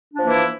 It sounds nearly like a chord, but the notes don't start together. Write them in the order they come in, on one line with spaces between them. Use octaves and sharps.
D4 F3 A#3 E3 E4